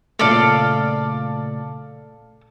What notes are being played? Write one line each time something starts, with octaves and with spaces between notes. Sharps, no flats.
A#2 C#3 A3 A4 D5 F5